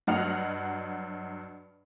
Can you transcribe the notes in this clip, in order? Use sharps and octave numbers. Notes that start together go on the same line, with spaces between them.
G2 F#3 D#5 F#5 F6 F7